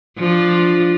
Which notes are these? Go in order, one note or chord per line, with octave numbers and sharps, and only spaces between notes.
F3 D4 F4